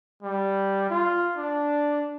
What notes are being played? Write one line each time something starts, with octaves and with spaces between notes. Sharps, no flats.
G3
F4
D4